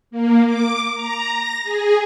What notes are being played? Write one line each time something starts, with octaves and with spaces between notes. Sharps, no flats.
A#3
D6
A#5
A#6
G#4